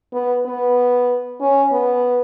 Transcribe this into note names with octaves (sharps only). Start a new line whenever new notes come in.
B3
B3
C#4
B3